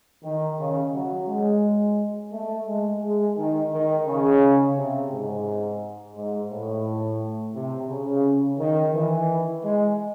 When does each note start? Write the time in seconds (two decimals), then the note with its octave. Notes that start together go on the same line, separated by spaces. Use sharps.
0.24 D#3
0.59 C#3
0.94 F#3
1.28 G#3
2.32 A3
2.67 G#3
3.02 G#3
3.37 D#3
3.72 D#3
4.07 C#3
4.77 C3
5.11 G#2
6.15 G#2
6.51 A2
7.55 C3
7.89 C#3
8.59 D#3
8.94 E3
9.64 G#3